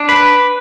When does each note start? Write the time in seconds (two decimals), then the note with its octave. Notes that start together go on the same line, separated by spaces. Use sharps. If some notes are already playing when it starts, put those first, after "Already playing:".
Already playing: D4
0.09 B4